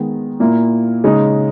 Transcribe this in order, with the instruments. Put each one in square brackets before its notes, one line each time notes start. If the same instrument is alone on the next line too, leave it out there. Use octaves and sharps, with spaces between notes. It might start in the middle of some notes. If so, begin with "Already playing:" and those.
Already playing: [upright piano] D#3 G#3 B3
A#2 A#3 E4
C#3 G#3 D#4